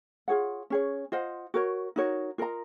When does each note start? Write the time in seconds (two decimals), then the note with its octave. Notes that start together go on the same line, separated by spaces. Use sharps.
0.28 F4 G#4 C#5 F#5
0.70 C#4 G#4 C#5
1.12 F4 C5 D#5 F#5
1.54 F#4 A#4 C#5
1.96 D#4 F#4 A#4 C#5
2.38 F4 A#4 D#5 A#5